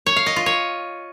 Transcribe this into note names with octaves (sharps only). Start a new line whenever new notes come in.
C#5
F5
D#5
F4
C#5